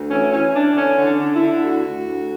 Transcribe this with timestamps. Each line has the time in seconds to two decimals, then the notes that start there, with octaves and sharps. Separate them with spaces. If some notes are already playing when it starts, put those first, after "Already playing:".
Already playing: D2
0.10 E3 C#4
0.32 E3 C#4
0.54 E3 D4
0.75 D3 C#4
0.97 D3
1.05 D4
1.19 D3
1.34 E4
1.41 D3
1.63 D2 F#4
1.85 D2
2.07 D2